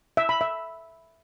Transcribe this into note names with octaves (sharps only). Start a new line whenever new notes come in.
E5
B5
E5